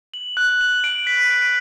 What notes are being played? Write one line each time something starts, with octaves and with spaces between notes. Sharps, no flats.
F#7
F#6
F#7
D7
B6
D7